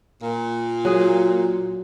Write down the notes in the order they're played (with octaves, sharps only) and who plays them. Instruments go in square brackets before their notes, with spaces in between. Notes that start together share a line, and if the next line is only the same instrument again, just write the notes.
[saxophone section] A#2
[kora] F#3 G#4